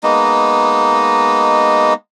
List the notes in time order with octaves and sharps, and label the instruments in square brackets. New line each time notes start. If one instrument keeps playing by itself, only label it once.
[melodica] G#3 A#3 B3 D#4